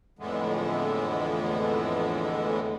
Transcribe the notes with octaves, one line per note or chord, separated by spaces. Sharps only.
F2 A2 D3 E3 G#3 B3